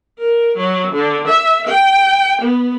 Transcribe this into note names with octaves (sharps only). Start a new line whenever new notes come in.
A#4
F#3
D3
E5
G5
B3